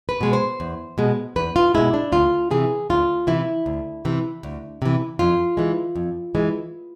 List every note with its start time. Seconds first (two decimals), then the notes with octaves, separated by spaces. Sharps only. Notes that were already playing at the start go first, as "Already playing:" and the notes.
0.09 B4
0.21 B2 G#3
0.33 C5
0.60 E2
0.98 B2 G#3
1.36 E2 B4
1.56 F4
1.74 B2 G#3 E4
1.94 D4
2.12 D2 F4
2.51 C3 E3 G#4
2.90 D2 F4
3.27 C3 E3 E4
3.66 D2
4.05 C3 E3
4.43 D2
4.82 C3 E3
5.19 F2 F4
5.57 E3 G#3
5.96 F2
6.35 E3 G#3